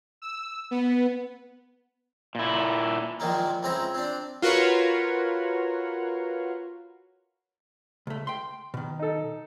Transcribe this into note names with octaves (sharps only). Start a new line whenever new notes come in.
E6
B3
A#2 E4
A#1 A#2 D#3 F#3 G#3 A#3
C#2 G#3 C4 E4 C#5 A#5
C4 D4
F4 F#4 A#4 B4 C#5
C#2 A3
G5 C6
B2 D#3
D#4 A4